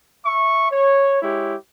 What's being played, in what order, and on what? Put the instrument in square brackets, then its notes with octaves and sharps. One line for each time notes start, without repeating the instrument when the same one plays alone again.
[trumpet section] E5 C#6
C#5
G#3 E4 G4 C#5